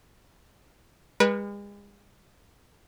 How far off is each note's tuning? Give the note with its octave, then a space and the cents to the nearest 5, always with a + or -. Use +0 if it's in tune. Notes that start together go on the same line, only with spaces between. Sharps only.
G#3 -40 B4 -30